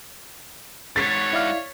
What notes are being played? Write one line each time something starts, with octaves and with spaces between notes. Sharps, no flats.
G#2 F#4 C#5 A6 B6
E4 D5 F5